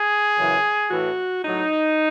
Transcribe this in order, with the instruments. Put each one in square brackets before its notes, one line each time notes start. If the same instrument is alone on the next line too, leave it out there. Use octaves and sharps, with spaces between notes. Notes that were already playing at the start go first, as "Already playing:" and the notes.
Already playing: [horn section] G#4
F#2 C#3 E3
A2 E3 F#4
A2 F#3 D#4